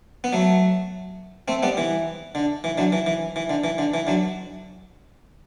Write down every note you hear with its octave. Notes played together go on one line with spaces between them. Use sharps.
B3
F#3 A3
A3 C4
G3 B3
E3
D3
E3
D3 F#3
E3
E3
E3
D3
E3
D3
E3
D3 F#3